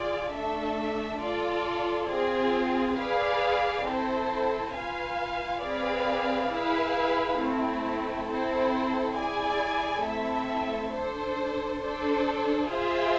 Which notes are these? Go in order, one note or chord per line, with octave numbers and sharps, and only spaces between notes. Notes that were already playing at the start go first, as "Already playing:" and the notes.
Already playing: F4 G#4 D5
A3 D4 A4 E5
F4 A4 D5
C4 F4 G#4
G#4 B4 D5 F5
C4 E4 A4 C5
F4 B4 F5 G#5
C4 G#4 B4 D5 F5
E4 G#4 B4 F5
A3 C4 E4
C4 E4 A4 C5
E4 G#4 D5 G#5
A3 C4 E4 A4 E5
D4 A4 C5
D4 A4 C5
F4 G#4 C5 E5